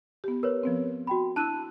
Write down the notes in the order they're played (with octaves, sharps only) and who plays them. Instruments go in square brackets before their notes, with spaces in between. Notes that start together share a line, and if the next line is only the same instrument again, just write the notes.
[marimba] B3 G4
[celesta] A#4 B4 C#5
[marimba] F3 B3 C4
[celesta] F#4 G5 B5
[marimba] D4 E4 E6 [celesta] A5 F#6 D#7